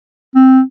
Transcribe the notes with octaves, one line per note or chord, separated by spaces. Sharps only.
C4